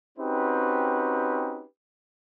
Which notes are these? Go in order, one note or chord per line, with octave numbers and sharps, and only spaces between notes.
C4 C#4 D#4 F#4 G4 B4